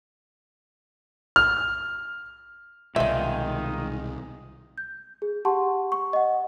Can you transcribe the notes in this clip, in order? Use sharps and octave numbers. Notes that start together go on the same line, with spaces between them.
F6
C2 B2 D#3 G#3 D#4 F4 D5 E5
G6
G#4
G4 F#5 A5 C6 C#6
C#6
D#5 F#5